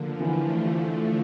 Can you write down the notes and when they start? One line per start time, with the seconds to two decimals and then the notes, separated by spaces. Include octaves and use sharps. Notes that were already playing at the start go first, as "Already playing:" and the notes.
Already playing: D3 F3 A#3
0.20 E3 A3
0.64 A3 F4